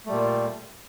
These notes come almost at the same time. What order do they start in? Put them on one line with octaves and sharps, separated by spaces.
A3 G3 A#2